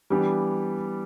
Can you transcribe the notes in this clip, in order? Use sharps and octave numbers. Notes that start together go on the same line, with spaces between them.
E3 G3 B3 D4 G4